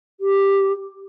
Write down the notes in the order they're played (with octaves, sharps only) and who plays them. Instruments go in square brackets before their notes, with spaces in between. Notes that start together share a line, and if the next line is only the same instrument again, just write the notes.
[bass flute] G4